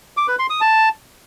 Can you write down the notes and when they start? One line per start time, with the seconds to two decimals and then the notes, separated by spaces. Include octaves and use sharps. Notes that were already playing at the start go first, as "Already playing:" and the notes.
0.17 D6
0.28 B4
0.39 C6
0.50 D#6
0.61 A5